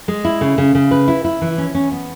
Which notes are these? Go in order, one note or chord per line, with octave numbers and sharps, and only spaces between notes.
G#3
E4
C#3
C#3
C#3
B4
E4
E4
E3
C#4
C#4
B3